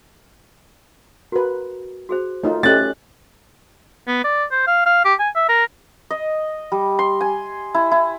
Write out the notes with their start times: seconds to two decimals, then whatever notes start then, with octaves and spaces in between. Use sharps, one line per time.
1.32 F#4 A#4 B4
2.09 F#4 G#4 C5
2.43 A3 D#4 F4 C#5
2.63 A3 C#4 G4 A4 C#5 D#5 F#6 A6
4.08 B3
4.24 D5
4.51 C5
4.67 F5
4.86 F5
5.05 G4
5.19 G#5
5.36 E5
5.49 A#4
6.11 D#5
6.72 G3
6.99 C6
7.21 G#5
7.75 E4
7.92 E4